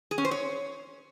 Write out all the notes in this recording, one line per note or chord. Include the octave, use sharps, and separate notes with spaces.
G#4
C#4
C5
C#5